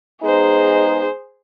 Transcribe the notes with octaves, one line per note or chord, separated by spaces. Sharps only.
G#3 B3 D#4 G#4 C5